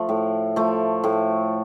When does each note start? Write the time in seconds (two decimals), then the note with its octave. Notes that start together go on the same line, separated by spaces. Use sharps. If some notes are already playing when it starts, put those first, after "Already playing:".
Already playing: F3 A3
0.09 A2
0.56 F3 A3
1.04 A2